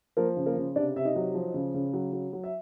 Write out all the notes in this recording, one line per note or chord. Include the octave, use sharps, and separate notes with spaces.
F3 A#3 A#4
C#3
A#3 A#4
C#3
C3 D4 D5
C3 E5
D#4 D#5
F#3
F3
C#3
C#3
F#3
F#3
F#3
E5